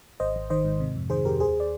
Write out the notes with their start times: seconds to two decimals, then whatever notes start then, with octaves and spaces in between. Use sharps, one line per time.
0.20 G#1 C5 D#5
0.36 G#1
0.50 D#3 C5 D#5
0.65 G#2
0.80 C3
0.96 F2
1.10 D#3 G#4 C5
1.25 F2 G4 A#4
1.40 D#2 G#4 C5
1.60 D5